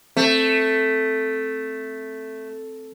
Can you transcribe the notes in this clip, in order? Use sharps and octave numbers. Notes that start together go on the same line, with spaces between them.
A3 C4